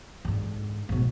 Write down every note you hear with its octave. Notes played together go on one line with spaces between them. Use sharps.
G#2 D3
G#2 B2